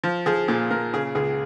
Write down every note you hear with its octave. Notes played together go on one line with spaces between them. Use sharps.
F3
F3 G#4
A#2 G#4
A#2 A#4
C#3 G#4
C#2 G#4